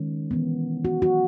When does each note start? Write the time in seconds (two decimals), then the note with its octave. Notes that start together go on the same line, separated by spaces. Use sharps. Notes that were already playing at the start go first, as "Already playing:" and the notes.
Already playing: D#3 G#3 C#4
0.31 E3 B3
0.85 F#4
1.02 F#4